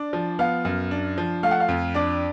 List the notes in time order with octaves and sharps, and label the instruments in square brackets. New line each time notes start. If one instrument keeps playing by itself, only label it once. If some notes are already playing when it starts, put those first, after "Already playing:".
Already playing: [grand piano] D4 [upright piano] D5
[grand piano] F3
[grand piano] B3 [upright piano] F5
[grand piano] F#2
D4
F3
[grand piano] A3 [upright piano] F5
[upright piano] F#5
F5
[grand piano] F2
[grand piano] D4 [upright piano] D5